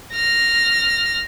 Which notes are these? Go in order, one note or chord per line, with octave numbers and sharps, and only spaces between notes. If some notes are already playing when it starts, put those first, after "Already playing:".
F6 A#6